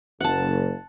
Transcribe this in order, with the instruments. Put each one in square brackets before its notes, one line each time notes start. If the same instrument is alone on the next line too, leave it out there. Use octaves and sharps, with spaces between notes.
[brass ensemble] F#1 [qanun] F#5 A5